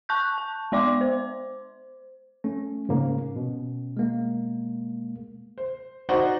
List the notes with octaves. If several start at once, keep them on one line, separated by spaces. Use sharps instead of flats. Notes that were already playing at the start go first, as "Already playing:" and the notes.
A5 C#6 F#6 G6
A5
G#3 B3 D5 C6 D6
C5
A3 C#4
G#2 C#3 A#3
B2
G#3 A#3
C5
D#4 F#4 C5 D5 F#5